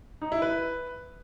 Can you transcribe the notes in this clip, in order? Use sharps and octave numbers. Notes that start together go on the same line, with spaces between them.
D#4
E4
B4